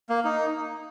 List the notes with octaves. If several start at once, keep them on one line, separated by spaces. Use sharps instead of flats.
A#3
D#4